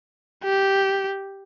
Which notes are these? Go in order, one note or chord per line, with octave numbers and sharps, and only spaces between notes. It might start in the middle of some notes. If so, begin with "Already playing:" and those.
G4